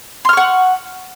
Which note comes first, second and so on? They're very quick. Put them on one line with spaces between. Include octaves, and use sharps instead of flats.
C6 F6 C#6 F#5